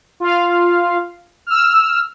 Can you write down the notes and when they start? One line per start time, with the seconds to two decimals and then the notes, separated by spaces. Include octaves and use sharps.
0.20 F4 F5
1.47 E6 F6